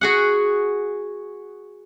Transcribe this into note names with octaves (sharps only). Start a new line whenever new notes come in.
F#4 G#4 F#5